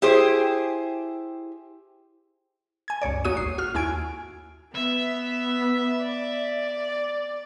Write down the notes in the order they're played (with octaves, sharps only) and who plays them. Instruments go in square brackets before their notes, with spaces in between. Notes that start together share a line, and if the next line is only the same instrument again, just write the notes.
[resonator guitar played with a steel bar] E4 G4 G#4 C5
[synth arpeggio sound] G#5 G#6
C#2 G2 C#5 D5
D#2 A#3 F#4 C#5 D#6 D#7
G#1 G#2 C7
F#4 F6
D#2 E4 F#4 G#5 G#6 D7
[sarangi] B3 [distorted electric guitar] E5
[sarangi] D5